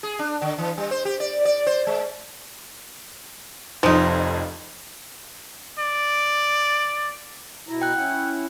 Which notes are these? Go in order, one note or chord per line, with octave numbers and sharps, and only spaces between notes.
G#4
D4
D3
E3
G3
C5
G4
D5
D5
C5
G#3
F1 F2 F3 D#4
D5
B2 E4 A#5
G5 F#6
C#4 E4 F#5